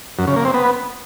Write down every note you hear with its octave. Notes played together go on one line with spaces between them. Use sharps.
F#2
C#3
A#3
C4
B3